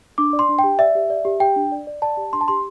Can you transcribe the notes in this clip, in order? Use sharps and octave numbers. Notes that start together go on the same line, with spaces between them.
D4 D6
D5
C6
D4
G5
G4
D5 E5
G4
D5
G4
G4 G5
D4
D5
D5
D5 A5
G4
D4 C6
A5
G4 C6